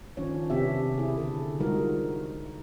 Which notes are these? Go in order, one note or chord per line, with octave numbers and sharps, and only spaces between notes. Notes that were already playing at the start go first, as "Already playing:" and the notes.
D#3 F3 C#4 D4 C#5
C3 B3 C4 D4 G4 E5
E4 G#4
D3 A4
F3 G3 G#3 D#4 F#4 A#4